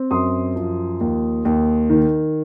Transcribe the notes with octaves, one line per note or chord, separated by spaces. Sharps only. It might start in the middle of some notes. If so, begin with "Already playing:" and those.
Already playing: C4
F#2 C6 D#6
F3
D#2
D#2
D#3